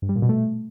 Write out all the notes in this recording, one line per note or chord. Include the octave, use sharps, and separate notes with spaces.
G2
G3
A#2
B2
A3